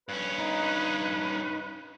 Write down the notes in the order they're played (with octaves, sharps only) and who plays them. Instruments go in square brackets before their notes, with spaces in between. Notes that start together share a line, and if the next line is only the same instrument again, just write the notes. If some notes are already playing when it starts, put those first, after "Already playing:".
[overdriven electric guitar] G2 C#4 [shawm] B4
[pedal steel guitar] D#4